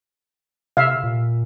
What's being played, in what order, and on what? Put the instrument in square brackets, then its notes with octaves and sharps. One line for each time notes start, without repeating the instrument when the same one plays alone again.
[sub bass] C3 [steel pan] E5 F5
[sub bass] A#2